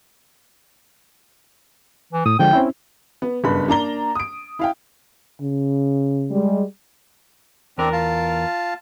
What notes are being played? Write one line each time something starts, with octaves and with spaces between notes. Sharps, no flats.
E3
A2 D#6
D3 F3 G#3 G5
C4 C#4 E4
B3
F#1 G2 B3 B5
A#3 D4 A#5 G7
D#6 D7
E4 F5 G5
C#3
G3 G#3
E2 C4 D4 A#4
F4 F5 A5